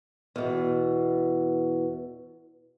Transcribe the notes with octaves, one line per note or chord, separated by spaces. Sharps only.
E2 B2